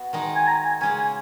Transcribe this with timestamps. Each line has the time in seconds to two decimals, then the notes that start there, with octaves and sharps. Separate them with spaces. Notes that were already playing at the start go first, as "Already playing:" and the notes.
Already playing: B3 F#4
0.13 D#3 G#3 D#4
0.35 G#5
0.47 A#5
0.64 G#5
0.81 C#3 G#3 C#4 G#5
0.98 G#5